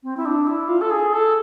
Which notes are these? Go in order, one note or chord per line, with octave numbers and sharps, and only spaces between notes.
C4
E4
D4
E4
F4
A4
G#4
A4